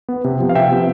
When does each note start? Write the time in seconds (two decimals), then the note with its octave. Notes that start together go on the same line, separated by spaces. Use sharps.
0.09 B3
0.24 C3
0.40 F3 B3
0.49 F5
0.55 C3 E5 G5
0.71 F3 B3